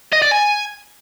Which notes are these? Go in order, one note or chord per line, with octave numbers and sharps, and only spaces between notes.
D#5
D5
G#5